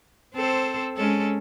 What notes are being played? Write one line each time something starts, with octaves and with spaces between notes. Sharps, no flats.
C4 A4 C5
G#3 C#4 A4